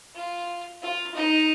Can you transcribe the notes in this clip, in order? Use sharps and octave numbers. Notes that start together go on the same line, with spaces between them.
F4
F4
D#4